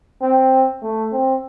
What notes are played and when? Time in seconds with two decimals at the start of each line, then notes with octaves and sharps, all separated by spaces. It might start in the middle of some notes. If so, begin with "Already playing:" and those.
0.21 C4
0.82 A3
1.12 C4